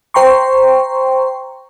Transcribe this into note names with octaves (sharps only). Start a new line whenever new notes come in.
C5 G5 A#5 C6 C#6